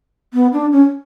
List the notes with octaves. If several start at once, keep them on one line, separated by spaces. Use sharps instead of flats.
B3
D4
C#4